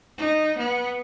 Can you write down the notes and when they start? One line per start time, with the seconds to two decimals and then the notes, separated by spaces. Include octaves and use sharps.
0.18 D#4
0.59 B3